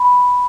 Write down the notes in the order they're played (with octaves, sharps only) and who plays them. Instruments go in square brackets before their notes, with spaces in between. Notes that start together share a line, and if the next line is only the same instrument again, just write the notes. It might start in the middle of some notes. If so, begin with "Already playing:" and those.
Already playing: [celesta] B5